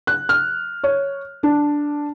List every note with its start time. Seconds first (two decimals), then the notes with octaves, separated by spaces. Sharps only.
0.07 F#6
0.29 F6
0.83 C#5
1.43 D4